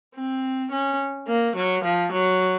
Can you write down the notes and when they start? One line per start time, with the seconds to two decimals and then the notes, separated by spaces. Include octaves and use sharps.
0.15 C4
0.71 C#4
1.28 A#3
1.56 F#3
1.84 F3
2.12 F#3